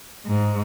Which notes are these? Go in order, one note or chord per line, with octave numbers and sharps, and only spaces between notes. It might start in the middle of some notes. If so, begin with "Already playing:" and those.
G#2